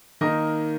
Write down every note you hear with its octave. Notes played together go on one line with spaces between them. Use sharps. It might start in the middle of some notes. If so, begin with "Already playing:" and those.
D#3 A#3 D#4 A#4 D#5